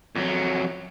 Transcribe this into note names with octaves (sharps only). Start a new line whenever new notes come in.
F2 F#3